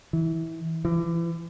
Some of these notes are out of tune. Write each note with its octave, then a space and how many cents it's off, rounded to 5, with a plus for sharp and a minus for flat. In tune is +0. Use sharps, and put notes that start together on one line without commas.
E3 -20
E3 +35